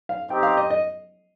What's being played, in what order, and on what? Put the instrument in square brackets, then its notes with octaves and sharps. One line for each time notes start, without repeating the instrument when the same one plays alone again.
[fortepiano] F5
[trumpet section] C4 D#4 G4 [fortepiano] G5
[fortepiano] F5
D#5
D#5